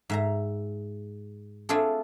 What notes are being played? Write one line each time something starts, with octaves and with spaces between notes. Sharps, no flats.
G#2 E5 A#5
A3 C4 D4 F4 G#4 A4